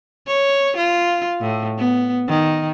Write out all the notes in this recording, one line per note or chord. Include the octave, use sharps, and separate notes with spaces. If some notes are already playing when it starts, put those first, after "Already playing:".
C#5
F4
A2
B3
D#3